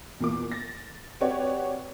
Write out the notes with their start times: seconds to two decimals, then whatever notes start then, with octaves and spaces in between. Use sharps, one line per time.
0.20 E2 A#2 D6
0.52 A6 A#6
1.20 C4 F#4 G4 B4 C#5 D5